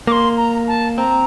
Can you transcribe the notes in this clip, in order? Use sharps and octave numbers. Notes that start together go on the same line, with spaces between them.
A#3 C6 D6
A#5
A5
C4 A#5